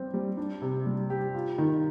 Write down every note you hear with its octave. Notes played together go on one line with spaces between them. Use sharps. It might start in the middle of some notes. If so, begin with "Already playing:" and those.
Already playing: G3 C4
G3
D4
C3
G3
G4
F4
D#3